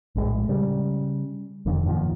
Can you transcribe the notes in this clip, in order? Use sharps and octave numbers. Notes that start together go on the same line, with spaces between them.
A#1 A2 G#3
C#3 G3
E1 F2 D3 D#3
F#2 A#2 D#3 F3